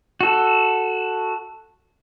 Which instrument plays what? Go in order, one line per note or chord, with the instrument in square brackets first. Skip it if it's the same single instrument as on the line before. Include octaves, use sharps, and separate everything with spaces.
[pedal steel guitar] F#4 A4